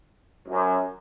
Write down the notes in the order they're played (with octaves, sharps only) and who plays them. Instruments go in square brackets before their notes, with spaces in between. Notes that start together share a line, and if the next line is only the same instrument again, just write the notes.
[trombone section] F#2